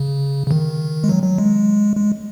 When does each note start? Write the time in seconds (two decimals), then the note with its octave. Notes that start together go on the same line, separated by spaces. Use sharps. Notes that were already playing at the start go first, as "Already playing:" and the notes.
Already playing: C#3
0.47 C#3
0.51 D#3
1.04 G#3
1.09 F#3
1.24 F#3
1.38 G#3
1.96 G#3